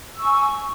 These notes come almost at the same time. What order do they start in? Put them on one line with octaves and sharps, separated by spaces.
E6 C#6 G#5